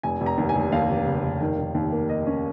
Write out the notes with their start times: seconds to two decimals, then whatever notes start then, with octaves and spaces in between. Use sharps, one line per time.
0.03 F1 G#5
0.21 F1
0.26 A#5
0.38 D#2
0.49 G#5
0.55 F1
0.72 D#2 F5
0.89 F1
1.06 C#3
1.24 F1
1.41 D#3
1.58 D#3
1.75 D#2
1.92 A#3
2.09 A#3 D#5
2.27 C#4